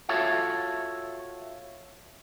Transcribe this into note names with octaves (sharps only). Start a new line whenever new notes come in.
F4 F#4 A4 C#5 E5 F5